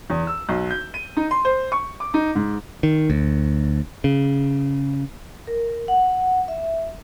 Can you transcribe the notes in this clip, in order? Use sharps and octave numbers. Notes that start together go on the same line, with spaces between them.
E2
E6
B1
G6
D#7
D#4
C6
C5
C#6
D6
D#4
G#2
D#3
D2
C#3
A#4
F#5
E5